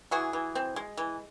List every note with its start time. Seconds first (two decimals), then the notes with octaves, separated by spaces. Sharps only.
0.11 E3 F#4 G#4
0.33 E3
0.55 C4
0.76 G#3
0.97 E3